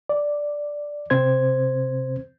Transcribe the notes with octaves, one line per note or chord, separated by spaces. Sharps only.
D5
C3 C4 C5 G#6